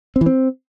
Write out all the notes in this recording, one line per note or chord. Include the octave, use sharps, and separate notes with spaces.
C4
E3
C4